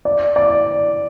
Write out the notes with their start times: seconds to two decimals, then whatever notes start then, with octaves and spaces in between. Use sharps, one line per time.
0.05 D5
0.36 D5